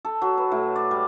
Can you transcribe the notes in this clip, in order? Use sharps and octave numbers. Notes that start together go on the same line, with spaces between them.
A4
F#3
B4
A2
D5
G3